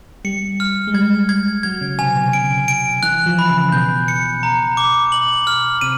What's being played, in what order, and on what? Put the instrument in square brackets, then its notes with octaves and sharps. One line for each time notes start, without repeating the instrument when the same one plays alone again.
[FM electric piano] G3 [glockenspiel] C#7
[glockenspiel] F6
[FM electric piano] G#3
[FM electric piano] G3 [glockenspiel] G#6
[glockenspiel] G#6
[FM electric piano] F#3 [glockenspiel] G#6
[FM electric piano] C#3
[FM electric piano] C3 [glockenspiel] G#5
[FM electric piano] B2
[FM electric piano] C#3 [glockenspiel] D7
[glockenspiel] D7
[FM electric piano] E3 [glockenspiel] F#6
[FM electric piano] F3
[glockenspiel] B5
[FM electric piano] C#3
[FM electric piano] B2 [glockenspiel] G6
[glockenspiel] C#7
A#5
D6
F#7
F6
[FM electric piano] C3 [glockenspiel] D#7